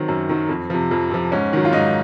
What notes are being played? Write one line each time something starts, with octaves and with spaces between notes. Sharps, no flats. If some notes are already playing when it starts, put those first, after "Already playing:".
Already playing: D#3 F#3 C4
F#2
D#3 F#3
F2
C3 F3
F2
C3 F3
G#2 C#4
D#3 F#3
F4
G#2 D#4